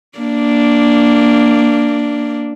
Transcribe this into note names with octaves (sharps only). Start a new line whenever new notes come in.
A#3 D4